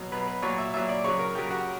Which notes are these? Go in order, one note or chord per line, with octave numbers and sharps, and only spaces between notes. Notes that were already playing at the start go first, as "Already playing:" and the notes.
Already playing: B2 F#3
B2 F#3 B4
B4
A#2 F#3 C#5
E5
A#2 F#3 E5
D5
C#3 F#3 C#5
A#4
C#3 F#3 G4
F#4